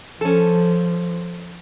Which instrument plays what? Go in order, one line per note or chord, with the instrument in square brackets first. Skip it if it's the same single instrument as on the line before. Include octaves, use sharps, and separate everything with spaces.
[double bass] F3 [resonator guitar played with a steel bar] C#4 A4